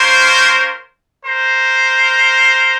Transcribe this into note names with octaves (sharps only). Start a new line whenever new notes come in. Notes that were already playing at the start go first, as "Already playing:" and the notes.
Already playing: A#3 C#4 F4 A#4 C5
A#4 C5